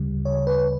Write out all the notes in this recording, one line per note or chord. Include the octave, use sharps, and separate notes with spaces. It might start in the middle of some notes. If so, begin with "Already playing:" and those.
Already playing: D2 C#3 G3
C#5
B4